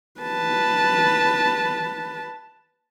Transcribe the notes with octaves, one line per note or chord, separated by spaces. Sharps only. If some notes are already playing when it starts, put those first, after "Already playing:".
B4 A5